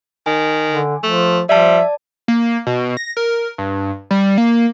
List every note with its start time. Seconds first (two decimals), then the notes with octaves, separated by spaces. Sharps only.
0.26 D#3 G#5
0.69 D3
1.03 F3 A3
1.49 F3 G3 D5 E5 A5
2.28 A#3
2.67 B2
2.97 A#6
3.17 A#4
3.58 G2
4.11 G3
4.38 A#3